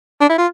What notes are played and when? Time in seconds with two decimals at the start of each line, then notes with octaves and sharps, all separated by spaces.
0.21 D4
0.30 E4
0.38 F4